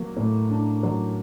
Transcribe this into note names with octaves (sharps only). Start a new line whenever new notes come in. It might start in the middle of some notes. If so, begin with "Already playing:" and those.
Already playing: F#3 A#3
A2
D4
F#3